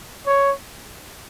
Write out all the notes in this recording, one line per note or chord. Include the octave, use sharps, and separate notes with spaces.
C#5